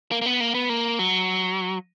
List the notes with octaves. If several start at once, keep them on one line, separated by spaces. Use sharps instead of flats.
A#3
A#3
B3
A#3
B3
A#3
F#3